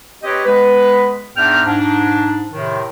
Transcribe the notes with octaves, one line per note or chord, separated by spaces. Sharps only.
C4 G4 B4 C#5 D#5
G#3 B3 B4
E2 G#2 D4 E5 G5 F6
G#2 D4
A2 C3 D#3